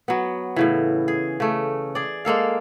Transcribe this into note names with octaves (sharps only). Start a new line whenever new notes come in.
F#3 B3
A2 C#3 E3
G#4
C#3 A3
G#4 D5
G#3 A#3 A4 F5